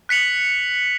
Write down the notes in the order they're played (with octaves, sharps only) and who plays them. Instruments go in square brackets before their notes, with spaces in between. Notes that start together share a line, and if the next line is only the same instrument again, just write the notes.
[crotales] F#6 B6 C#7 F7 F#7